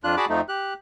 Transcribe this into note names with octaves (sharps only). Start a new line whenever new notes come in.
F2 D4 F4 F#6
F#4 G#4 D5 A5 B5 D6
F2 F3 A3 D#4
G4 F#6